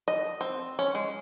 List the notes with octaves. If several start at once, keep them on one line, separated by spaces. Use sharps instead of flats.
D#5
C4
C#4
G#3